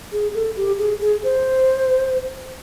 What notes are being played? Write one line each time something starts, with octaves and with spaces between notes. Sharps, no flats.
G#4
A4
G4
G#4
G#4
C5